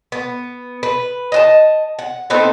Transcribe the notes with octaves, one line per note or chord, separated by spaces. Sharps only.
B3
B4
D#5 F#5 A5
F#5
A3 B3 C4 D#4